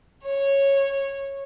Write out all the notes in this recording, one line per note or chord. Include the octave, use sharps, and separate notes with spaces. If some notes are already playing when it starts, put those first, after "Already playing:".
C#5